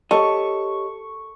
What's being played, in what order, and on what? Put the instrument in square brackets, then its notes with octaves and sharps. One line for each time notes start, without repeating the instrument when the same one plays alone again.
[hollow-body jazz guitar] G4 C#5 D#5 [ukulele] A4 [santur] C#6